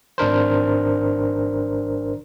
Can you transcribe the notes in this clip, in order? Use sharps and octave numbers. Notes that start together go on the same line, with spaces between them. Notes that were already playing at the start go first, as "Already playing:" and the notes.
G#1 D4 A#4 C5